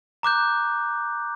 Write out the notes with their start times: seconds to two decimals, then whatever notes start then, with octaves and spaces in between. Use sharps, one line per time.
0.23 A#5 D6 F#6 G6